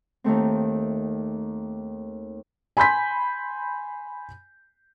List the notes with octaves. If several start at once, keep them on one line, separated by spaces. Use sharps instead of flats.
D#2 D#3 A3 C4
G#5 B5 C6 G6 B6